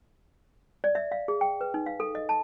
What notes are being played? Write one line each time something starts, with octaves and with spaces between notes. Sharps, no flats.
D5
E5
F5
G#4
G5
B4
D#4
F5
A4
D#5
A5